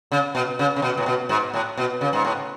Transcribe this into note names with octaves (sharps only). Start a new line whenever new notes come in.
C#3
B2
C#3
C#3
B2
A2
B2
G#2
A2
B2
C#3
G#2
A2